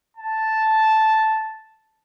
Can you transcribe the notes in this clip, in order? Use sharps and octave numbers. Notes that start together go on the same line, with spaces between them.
A5